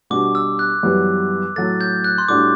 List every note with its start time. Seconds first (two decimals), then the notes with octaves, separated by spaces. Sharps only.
0.10 B2 G3 D4 F#4 D6
0.35 E6
0.59 F#6
0.83 F#2 E3 G3 B3
1.56 A2 F#3 A3 A6
1.81 G6
2.04 F#6
2.18 C6
2.28 A2 G3 D4 F#4 D6